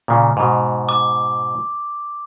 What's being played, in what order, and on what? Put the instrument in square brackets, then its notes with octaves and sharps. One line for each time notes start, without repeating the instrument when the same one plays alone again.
[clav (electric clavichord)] A#2 C#3
G#2 B2
[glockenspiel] D6